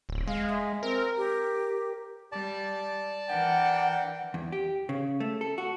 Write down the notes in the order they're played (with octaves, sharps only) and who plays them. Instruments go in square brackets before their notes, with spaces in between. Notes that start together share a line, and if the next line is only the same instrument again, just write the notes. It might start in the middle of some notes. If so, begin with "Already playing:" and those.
[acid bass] D1
[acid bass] G#3 [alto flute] F5
[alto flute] E5
[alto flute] C4 [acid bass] A#4
[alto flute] G4
[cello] G3 [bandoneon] D5 A5
[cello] E3 [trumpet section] D4 A#4 G5 [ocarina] F#5
[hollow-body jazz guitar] E2
G4
C#3
A3
A4
F#4